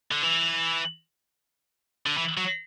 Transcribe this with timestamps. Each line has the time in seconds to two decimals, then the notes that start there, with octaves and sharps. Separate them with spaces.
0.11 D3
0.23 E3
2.06 D3
2.17 E3
2.37 F#3